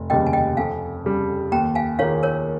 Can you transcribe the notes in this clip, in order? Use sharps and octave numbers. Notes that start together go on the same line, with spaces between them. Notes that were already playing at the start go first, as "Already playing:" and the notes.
Already playing: F1
D#2 C#3 G3 D#5 G5
G#5
D#5 G5
F2 F5 G#5
C#3 G3
D#2 G5 A#5
F5 G#5
D#3 A#3 F4 G#4 C#5 F5
A#4 C#5